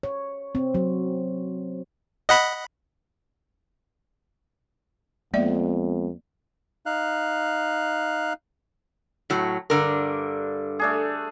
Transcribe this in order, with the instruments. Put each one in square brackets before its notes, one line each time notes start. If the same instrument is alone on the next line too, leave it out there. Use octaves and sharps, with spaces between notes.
[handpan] C#5
C4
F#3
[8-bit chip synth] D#5 F#5 B5
[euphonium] F2 [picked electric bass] G#3 B3 [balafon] A#3 D5 E5
[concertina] D#4 F5 F#6
[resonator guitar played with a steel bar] A2 F#3
[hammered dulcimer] G2 [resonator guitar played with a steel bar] D3 A#4
[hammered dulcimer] A3 D4 G#4